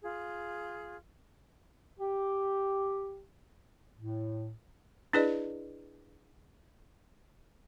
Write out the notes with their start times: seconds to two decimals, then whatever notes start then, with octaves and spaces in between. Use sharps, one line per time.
0.03 F4 G#4
1.99 G4
3.97 A2
5.13 D4 E4 G#4 B4 D5 D#5